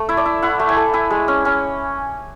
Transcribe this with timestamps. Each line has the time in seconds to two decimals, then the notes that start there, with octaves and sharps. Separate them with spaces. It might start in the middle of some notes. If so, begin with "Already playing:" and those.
Already playing: A3
0.09 E4
0.17 D5
0.26 E4
0.42 E4 F#5
0.59 A3
0.69 G#5
0.77 A3
0.93 E4 G#5
1.11 G#3
1.28 C#4
1.45 C#4